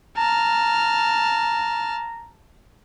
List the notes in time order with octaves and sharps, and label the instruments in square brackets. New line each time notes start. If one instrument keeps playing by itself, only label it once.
[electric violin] A5 F6 [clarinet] A#5